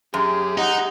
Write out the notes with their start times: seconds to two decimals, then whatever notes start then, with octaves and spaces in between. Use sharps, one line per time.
0.14 F#2 G4 G#4
0.58 D#4 F#5